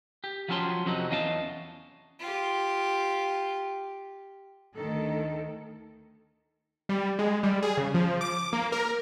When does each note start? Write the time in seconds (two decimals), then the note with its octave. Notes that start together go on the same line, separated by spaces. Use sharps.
0.24 G4
0.48 F3 F#3 B3 C#4 A5 C6
0.86 F2 C3 F#3 D#4
1.10 E2 C#4 D#5 F5 G#5 A5
2.20 F4 G4
4.76 D2 D#3 A4
6.89 G3
7.19 G#3
7.43 G3
7.63 G#4
7.77 C#3
7.94 F3
8.21 D6
8.53 A#3
8.72 A#4